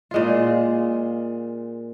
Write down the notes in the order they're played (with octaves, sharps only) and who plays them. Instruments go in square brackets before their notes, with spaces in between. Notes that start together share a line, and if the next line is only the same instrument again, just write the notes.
[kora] A#2 G#3 F4